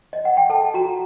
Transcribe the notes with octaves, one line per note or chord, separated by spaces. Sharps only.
D#5
F#5
G5
A4 A5
F#4 A#5